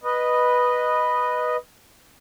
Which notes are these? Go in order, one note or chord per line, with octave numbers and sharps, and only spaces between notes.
B4 D#5